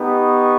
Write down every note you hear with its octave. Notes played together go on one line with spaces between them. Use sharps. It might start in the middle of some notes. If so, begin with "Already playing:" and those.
Already playing: B3 D#4 G4
C#6